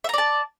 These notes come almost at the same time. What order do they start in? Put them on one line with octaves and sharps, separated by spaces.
E5 A#5 D5 A5